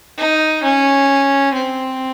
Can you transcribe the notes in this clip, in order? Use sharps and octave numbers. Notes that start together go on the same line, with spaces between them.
D#4
C#4
C4